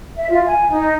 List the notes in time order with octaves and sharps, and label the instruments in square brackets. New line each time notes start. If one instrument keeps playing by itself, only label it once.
[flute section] E5
F4
G#5
D#4